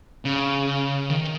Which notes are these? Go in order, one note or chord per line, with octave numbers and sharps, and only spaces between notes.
C#3
D#3